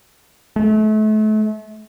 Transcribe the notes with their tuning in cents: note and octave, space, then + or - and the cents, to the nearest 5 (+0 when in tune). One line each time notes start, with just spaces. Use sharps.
A3 -35